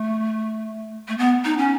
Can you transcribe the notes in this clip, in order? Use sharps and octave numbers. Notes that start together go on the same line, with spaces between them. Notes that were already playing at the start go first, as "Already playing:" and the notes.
Already playing: A3
A3
B3
D#4
C#4